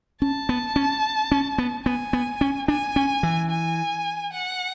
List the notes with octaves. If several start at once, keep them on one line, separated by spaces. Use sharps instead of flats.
C#4 A5
B3
C#4
C#4
B3
B3 G#5
B3
C#4
D4 G#5
C#4
E3
G#5
F#5